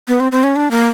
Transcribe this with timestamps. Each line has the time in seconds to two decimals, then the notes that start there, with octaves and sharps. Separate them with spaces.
0.08 B3
0.20 C4
0.32 C4
0.44 C#4
0.56 D4
0.71 A#3